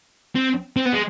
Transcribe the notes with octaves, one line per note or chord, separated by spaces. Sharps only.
C4
C4
B3
G#3